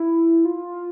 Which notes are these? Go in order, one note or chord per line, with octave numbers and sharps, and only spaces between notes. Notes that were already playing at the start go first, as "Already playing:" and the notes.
Already playing: E4
F4